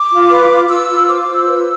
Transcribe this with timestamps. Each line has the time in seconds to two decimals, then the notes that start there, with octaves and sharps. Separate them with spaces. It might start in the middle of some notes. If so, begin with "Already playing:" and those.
Already playing: D6
0.12 F4
0.31 B4
0.51 F4
0.69 F4 E6
0.89 F4
1.08 C5 D6
1.21 D6
1.28 F4
1.34 E6
1.47 B4